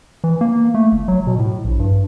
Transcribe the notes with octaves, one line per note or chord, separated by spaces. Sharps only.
E3
A#3
A3
G1
F#3
B2
A2
A#1
G2